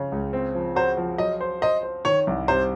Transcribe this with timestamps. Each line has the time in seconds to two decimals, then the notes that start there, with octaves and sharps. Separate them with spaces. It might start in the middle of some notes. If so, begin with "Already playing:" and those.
Already playing: C#3 F3
0.12 C#2
0.33 C4
0.55 F3
0.76 F#4 C5
0.97 F3
1.18 F#3 D#5
1.41 C5
1.62 C5 D#5
1.83 C5
2.05 D#3 C#5
2.27 C2
2.48 C3 C5